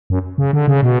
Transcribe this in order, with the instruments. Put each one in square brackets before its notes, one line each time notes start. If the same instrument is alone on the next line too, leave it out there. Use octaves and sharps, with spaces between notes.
[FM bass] F#2
C#3
D3
C#3
B2